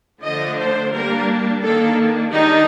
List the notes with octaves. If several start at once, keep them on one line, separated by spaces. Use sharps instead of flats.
D3 F3 A3 D4 D#5
C5
G3 A#3 D4 A#4
D#3 A#3 D4 A4
D#3 G3 D4 D#4